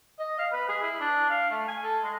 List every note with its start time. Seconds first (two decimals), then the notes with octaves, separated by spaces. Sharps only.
0.19 D#5
0.38 F5
0.52 B4
0.69 G#4
0.82 E4
1.00 D4
1.30 F5
1.51 A3
1.68 G#5
1.82 A4
2.03 G#3